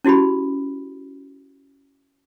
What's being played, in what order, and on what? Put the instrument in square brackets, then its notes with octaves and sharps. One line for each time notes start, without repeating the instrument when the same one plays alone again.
[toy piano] C#4 E4 F#4 G4 B5